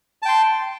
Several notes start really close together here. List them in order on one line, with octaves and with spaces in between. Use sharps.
A5 G5 C6